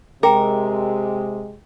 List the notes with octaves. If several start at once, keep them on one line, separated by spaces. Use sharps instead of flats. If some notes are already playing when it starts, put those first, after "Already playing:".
C3 G#3 G#4 A#4 G5 A#5